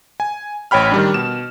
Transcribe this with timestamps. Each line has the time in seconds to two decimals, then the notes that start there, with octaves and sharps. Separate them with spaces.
0.20 G#5
0.71 A1 C#5 G5 B5 F6
0.91 D#3 G3 D4
1.14 B2 E7